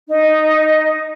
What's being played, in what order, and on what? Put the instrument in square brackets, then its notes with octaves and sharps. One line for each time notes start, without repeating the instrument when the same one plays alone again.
[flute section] D#4